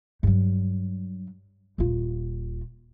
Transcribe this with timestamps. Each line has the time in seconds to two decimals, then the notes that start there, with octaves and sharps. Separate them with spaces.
0.23 G2 F#3
1.78 D#1 F4